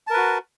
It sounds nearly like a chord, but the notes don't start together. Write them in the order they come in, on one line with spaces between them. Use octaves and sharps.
A5 A#4 B4 F#4